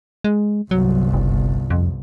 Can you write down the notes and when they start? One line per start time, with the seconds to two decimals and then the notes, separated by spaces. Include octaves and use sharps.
0.24 G#3
0.71 G1 C2 F#3
1.13 F#1
1.70 F2